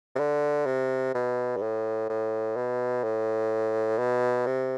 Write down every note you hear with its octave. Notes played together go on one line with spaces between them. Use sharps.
C3
D3
C3
B2
G2
A2
A2
B2
A2
B2
C3